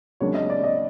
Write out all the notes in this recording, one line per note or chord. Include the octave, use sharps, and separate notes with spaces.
C#2 C#3 F#3 A#3 D4 C#5
D#5
D5
D#5